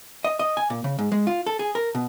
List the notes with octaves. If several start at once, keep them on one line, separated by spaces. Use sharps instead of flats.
D#5
D#5
G#5
A#2
C#3
G#2
G#3
F4
A4
G#4
A#4
B2